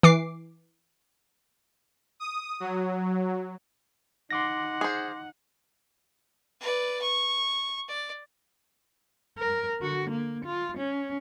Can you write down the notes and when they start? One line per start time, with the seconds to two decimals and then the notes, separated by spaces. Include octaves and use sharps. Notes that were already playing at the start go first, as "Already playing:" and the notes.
0.03 E3 D6 C7
2.20 D#6
2.60 F#3
4.31 D#4 F#5 C6 D6 A#6
4.81 G#4 C5
6.61 B4 D5
7.01 C#6
7.88 D5
9.38 A#4
9.81 D3 F#4
10.10 A#3
10.46 F4
10.78 C#4